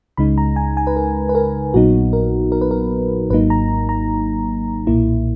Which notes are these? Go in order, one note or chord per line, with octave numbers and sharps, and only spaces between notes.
C#2 C#3 G#3 D#4 B5
A#5
G#5
G#5
B4
A#4
B4
A#4
A#1 A#2 F#3 B3 D#4 F#4
A#4
A#4
B4
A#4
G#1 G#2 F#3 A#3 D#4 B4
A#5
A#5
B1 A#2 A#3 E4